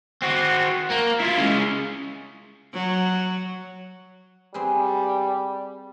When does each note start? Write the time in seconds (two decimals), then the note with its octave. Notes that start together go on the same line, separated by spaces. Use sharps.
0.22 C4 F#4
0.90 A#3
1.19 E4 F4
1.37 G#3 C#4
2.73 F#3
4.54 G3 C4 G#4 B4